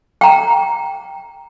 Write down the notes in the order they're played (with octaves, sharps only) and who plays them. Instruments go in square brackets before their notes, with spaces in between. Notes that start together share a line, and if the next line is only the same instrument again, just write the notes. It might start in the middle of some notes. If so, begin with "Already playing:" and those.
[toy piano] G5 A#5